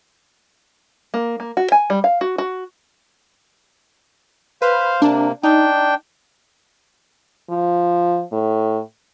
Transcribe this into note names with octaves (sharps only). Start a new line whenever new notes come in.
A#3
A#3
F#4
G#5
G3
F5
F#4
F#4
B4 C5 F5
C3 A#3 D4
D4 D#4 G5
F3
A2